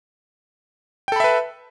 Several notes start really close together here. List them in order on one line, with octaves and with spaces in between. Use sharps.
G5 A4 B5 E5 B4